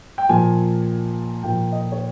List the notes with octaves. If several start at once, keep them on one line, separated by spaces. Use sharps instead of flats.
G5
A#2 F3 G#5
A#2 F3 G5
D#5
C#5